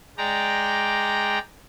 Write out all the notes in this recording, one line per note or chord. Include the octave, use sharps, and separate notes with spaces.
G#3 D5 G5 A#5